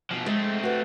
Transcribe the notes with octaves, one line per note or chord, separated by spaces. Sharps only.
B2 F3
G#3 A3 C4
F#4 B4